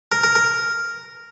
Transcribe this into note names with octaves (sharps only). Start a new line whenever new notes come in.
A#4
A#4
A#4